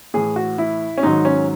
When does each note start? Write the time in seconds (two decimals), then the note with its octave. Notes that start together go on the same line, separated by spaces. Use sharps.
0.14 A2 E3 G#4
0.36 F#4
0.58 E4
0.98 C#4
1.03 G#2 D#3 F#3 D#4
1.25 C#4